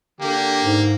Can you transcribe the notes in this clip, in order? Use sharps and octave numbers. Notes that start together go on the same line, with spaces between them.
D3 A#3 G4
G#2